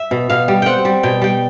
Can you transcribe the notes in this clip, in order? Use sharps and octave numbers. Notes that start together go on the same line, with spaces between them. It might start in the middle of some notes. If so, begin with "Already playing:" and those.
Already playing: E5
B2
B2 F5
G3
C4 F#5 G5
G3
B2 G5
G3 G5